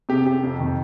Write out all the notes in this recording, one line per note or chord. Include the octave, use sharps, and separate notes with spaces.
C3 G4
C3 G4
F2
D#3